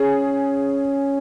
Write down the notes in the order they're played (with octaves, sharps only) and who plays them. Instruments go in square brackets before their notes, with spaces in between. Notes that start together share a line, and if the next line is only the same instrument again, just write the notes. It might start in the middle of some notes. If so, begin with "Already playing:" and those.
Already playing: [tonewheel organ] C#4 [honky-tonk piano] G#4